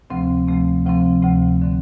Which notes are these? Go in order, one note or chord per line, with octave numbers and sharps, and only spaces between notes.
D2 C3 F3 A3 C4
D2 C3 F3 A3 C4
D2 C3 F3 A3 C4
D2 C3 F3 A3 C4
D3 A3 C4